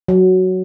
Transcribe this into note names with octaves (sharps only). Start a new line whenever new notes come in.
F#3